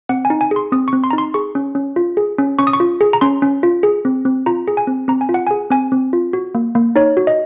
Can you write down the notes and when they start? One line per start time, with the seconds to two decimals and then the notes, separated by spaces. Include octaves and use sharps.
0.09 C4 F#5
0.25 G#5
0.30 D#4
0.41 G#5
0.51 G#4 C6
0.72 C4 D#6
0.88 C#6
0.93 C4
1.04 C6
1.11 A#5
1.13 D#4
1.18 C6
1.34 G#4 C#6
1.55 C#4
1.75 C#4
1.96 F4
2.17 G#4
2.38 C#4
2.59 C#4 C#6
2.67 D#6
2.73 C#6
2.80 F4
3.01 G#4
3.13 A#5
3.21 C#4 C6
3.42 C#4
3.63 F4
3.83 G#4
4.05 C4
4.25 C4
4.46 F4 A#5
4.68 G#4
4.77 G#5
4.87 C4
5.08 C4 A#5
5.21 G#5
5.29 F4
5.34 F#5
5.47 G#5
5.51 G#4
5.70 C4 G#5
5.92 C4
6.13 F4
6.33 F#4
6.55 A#3
6.75 A#3
6.96 D#4 C#5
7.17 F#4
7.27 D#5